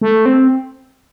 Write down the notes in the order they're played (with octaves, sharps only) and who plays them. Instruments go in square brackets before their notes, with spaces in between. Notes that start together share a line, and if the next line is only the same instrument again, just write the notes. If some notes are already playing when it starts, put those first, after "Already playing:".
[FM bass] A3
C4